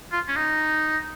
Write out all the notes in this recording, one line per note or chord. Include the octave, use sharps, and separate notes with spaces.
F4
C#4
D#4